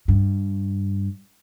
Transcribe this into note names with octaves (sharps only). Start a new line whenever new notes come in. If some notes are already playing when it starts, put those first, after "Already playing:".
G2